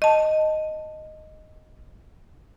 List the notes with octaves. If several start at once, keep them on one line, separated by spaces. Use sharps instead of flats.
D#5 A5